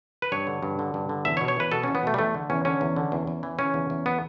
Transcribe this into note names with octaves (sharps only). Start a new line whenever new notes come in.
B4
G2 C#5
D3
G2
D3
G2
D3
E2 E5
C#5
B2
C#5
E2 B4
B2 A4
E2 C#4
B3
B2 A3
G3
E2 A3
D3
E2 C#4
D3 C#4
E2
D3
E2
E2
E3
C#3 C#4
E2
E2
B3